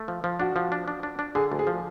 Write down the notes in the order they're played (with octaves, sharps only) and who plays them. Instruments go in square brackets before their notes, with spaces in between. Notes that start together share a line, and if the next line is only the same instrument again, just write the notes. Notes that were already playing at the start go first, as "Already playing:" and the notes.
Already playing: [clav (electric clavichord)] A3
F3
F3
[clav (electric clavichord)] D4 [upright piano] F#4
[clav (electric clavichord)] F3
D4
D4
D4
D4
[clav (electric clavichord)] D3 [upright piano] G#4
[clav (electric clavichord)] D2
[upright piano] G#4
[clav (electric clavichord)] F3